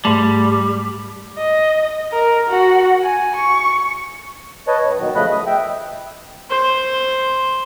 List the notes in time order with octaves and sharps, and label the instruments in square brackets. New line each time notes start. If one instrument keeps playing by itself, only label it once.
[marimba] G#2 A3 [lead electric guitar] G3
[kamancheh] D#5
A#4
F#4
G#5
C#6
[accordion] B4 C#5 D#5 A5
G2
B2 D#3 F#3
C#3 F3 A3 D#5 B5 F#6
D#6
E5 G5
[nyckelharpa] C5